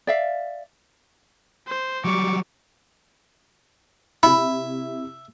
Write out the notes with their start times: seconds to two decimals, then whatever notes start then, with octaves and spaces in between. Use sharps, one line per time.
0.07 D5 E5 F5
1.67 C5
2.05 F#3 G3 C#6 D6
4.23 C3 E4 E5 B5